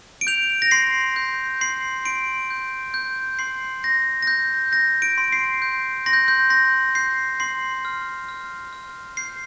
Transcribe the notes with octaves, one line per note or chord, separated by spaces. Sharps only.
D7
G6 F7
A#6
C6 C7
G6
C6 C7
C6 D7
G6
G6
C6 C7
G6 A#6
A#6
G6
G6 A#6
D7
C6
C7
G6
C6 A#6
G6
G6
C6 A#6
G6 C7
C6 C7
F6
F6
F6
G6 C7